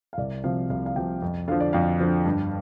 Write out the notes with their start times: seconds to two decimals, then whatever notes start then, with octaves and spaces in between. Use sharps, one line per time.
0.13 F5
0.18 C2 D5
0.44 C3 F3 F5
0.70 C2 F5
0.86 F5
0.96 C3 F3 G5
1.22 F2
1.48 D3 F3 F5
1.60 D5
1.73 F2 F5
2.00 D3 F3
2.26 G2